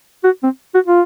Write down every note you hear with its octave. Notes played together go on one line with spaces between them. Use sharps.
F#4
C4
F#4
F4